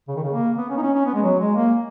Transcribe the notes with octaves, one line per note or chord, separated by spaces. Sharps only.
C#3
D#3
C#3
A#3
B3
C#4
D#4
C#4
C#4
B3
G#3
F#3
G#3
A#3